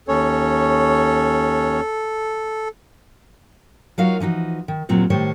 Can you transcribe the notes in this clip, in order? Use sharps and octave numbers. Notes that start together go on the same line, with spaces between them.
D#2 C#4 A4 C#5
F#3 D#4 F4 F#4 A#4 F5
E3 F3 D#4 F#4
D#3
D#2 A#2 F#3 C4 C5
A2 D#3 G3 C5 C#5